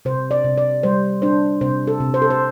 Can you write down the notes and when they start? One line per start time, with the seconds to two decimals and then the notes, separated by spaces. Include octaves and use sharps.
0.05 C3 C5
0.31 D5
0.44 C3
0.58 D5
0.83 G3 C5
1.22 D4 C5
1.61 C3 C5
1.87 A4
2.00 C3
2.14 C5
2.22 A4
2.30 C5